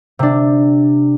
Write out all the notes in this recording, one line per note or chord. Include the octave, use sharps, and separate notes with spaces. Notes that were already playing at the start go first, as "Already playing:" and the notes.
C3 D4